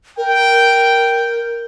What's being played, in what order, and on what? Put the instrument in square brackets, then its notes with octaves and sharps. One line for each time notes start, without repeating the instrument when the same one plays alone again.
[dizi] A#4 [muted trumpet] G5